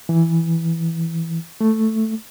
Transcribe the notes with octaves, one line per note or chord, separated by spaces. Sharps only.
E3
A3